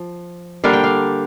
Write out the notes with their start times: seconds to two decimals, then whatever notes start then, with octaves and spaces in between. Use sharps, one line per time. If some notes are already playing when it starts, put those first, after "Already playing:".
Already playing: F3
0.64 D3 G3 A#3 D4 F5
0.73 G5
0.84 F5